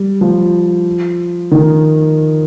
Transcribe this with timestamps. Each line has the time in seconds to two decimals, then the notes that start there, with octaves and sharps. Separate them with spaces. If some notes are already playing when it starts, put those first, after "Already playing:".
Already playing: G3
0.21 F3
1.51 D#3